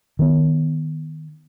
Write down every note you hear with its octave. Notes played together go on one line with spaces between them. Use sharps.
D#3 B3